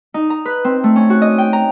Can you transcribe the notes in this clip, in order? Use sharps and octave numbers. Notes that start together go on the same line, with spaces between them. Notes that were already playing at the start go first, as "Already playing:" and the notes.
D#4
A#5
B4
C4
A3
C#4
F#4
D#5
G5
A#5